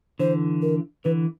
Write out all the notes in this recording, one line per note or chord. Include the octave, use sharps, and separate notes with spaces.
D3 E3 C5
A#4
D3 E3 B4